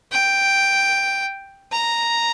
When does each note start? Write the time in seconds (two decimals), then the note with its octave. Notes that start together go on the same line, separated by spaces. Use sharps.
0.12 G5
1.72 A#5